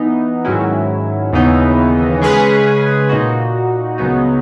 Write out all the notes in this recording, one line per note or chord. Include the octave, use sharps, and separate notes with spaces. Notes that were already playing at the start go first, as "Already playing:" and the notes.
Already playing: E3 B3 D#4
G#2 D#3 F#3 C#4 E4
D#2 C#3 E3 B3 D#4
C#3 G#3 C#4 G#4 B4
A#2 A#3 D#4 F#4
C#2 C#3 F#3 B3 D#4